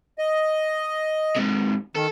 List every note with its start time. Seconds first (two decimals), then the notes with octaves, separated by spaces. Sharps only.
0.18 D#5
1.37 G#2 C3
1.96 D#3 A4